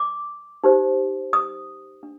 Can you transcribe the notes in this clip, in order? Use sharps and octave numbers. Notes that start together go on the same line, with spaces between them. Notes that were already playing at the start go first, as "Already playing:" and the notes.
Already playing: D6
D#4 G4 C5
D#6
D4